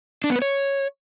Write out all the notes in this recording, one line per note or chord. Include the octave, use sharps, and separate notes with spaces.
D4
B3
B4
C#5